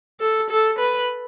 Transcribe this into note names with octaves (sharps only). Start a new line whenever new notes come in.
A4
A4
B4